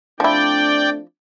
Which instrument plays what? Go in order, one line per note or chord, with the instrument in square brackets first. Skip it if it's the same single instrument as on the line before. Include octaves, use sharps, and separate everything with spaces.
[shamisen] F3 E4 [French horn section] A3 C4 D4 [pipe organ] D5 G5